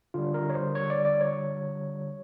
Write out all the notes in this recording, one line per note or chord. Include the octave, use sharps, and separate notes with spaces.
D3 G3 F4
A#4
C#5
C5
C#5
D5
D5
C#5